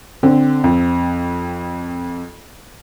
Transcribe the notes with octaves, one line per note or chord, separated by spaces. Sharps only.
D3 C4
F2